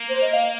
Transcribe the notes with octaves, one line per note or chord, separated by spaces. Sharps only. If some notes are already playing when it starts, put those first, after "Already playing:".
Already playing: A#3
C5
D#5
F5